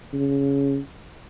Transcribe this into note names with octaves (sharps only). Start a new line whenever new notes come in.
C#3